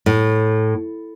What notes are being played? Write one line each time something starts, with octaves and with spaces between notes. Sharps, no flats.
A2